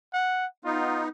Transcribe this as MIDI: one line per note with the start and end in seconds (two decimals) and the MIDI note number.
0.14 0.46 78
0.65 1.09 59
0.65 1.09 63
0.65 1.03 65